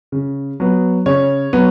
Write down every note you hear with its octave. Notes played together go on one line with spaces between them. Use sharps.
C#3
F#3 B3
C#3 C#5
F#3 B3